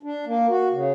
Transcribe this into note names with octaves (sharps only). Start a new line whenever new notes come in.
D4
A#3
F#4
C#3